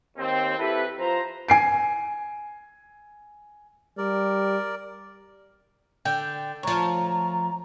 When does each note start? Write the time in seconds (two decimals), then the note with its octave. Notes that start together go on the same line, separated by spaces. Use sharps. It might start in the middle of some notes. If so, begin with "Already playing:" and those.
0.17 D#2 C4
0.58 C4 E4 G4 A4 B4
0.99 F3 C5 A#5
1.48 G#5 C7 D7
3.98 G3 A#4 D5
6.05 D3 G5
6.63 D2 F3 C#5 A5 A#5